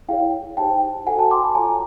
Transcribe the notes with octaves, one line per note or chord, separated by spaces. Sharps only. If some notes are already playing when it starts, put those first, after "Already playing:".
E4 G#4 C#5 F5 G5
D#4 G4 C5 G5 A5
F#4 A4 C5 F#5 G#5
G5 A5
C6 D6
A5 B5
F4 A4 C#5 G#5 A#5